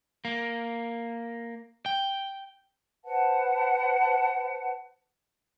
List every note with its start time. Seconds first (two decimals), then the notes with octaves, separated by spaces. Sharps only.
0.25 A#3
1.86 G5
3.04 B4 C5 F#5 A5